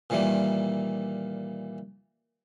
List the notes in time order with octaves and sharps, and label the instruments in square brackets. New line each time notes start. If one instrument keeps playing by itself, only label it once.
[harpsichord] A#2 D#3 E3 G3 A#3